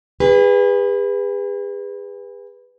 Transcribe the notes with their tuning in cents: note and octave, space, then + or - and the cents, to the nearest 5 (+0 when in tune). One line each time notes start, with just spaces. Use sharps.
G#4 -40 B4 +0